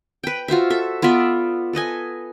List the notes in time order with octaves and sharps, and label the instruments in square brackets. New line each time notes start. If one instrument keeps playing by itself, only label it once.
[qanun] B4 G5
F4 F#4 C5 E5
A4 E5
B3 F4 D5 E5
A4 B4 D#5 G#5